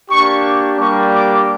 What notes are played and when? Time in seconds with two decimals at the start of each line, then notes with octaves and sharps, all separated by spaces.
0.10 A#3 D4 G4 C#6
0.45 C#6
0.79 G3 A#3 D4 G4 C#6
1.13 D6